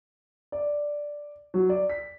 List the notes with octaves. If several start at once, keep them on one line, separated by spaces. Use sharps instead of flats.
D5
F#3
D5
B6